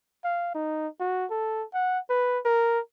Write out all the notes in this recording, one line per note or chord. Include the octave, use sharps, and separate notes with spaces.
F5
D#4
F#4
A4
F#5
B4
A#4